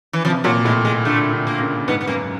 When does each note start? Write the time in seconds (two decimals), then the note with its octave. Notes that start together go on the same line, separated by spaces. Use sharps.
0.13 E3
0.24 C3 F3
0.44 A#2 F#3
0.65 A2 G#3
0.85 G#3
1.05 D3 A3
1.33 D3
1.47 A#3
1.61 C#3
1.88 G#2 B3
2.01 B3
2.07 F#2 A#3